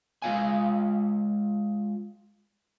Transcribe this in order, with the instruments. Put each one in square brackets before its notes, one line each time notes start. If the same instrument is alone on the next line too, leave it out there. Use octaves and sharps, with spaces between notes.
[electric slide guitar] G#3 F4 F5 G#5